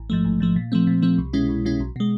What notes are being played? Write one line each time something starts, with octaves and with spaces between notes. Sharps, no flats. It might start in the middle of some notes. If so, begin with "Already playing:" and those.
Already playing: A1
G#2 F3 A3
A1
G#2 F3 A3
A#2
F3 A3 C4
A#2
F3 A3 C4
C2
B2 G#3 C#4 E4
C2
B2 G#3 C#4 E4
B1
B2 G#3